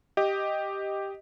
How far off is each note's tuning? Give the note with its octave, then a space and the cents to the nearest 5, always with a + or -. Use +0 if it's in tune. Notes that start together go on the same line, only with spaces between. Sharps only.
G4 +0 D#5 +0